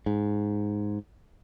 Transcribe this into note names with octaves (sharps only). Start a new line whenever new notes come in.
G#2